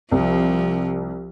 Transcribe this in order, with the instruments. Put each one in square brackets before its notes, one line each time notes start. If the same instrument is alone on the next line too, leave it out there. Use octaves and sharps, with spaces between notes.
[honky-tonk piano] C2 [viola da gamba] F3